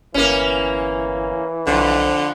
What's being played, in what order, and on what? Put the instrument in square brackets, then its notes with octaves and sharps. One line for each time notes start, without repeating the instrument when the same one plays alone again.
[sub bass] G1 [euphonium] E3 [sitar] A#3 C#4
[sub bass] B1 [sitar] F2 [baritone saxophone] D3